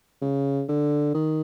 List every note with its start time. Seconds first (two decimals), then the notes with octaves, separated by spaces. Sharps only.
0.22 C#3
0.68 D3
1.14 D#3